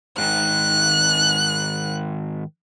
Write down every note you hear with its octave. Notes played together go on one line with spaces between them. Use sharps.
G#2 D#3 F#6